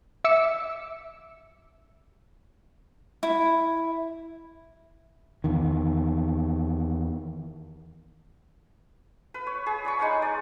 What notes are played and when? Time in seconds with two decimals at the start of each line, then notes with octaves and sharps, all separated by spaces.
0.24 E5 D6 E6 C#7
3.23 E4
5.44 E2 D#3
9.34 B4
9.47 C#5
9.66 G#4
9.85 D5 B5 C#6
9.99 G#3 D#4 C#5 F#5
10.22 D5